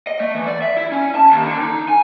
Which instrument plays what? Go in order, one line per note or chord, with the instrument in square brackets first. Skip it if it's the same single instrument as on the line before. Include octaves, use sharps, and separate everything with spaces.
[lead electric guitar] D#5
A3
E3
D5
E5
E4
C#4
A5
D#2
D3
D#4
G#5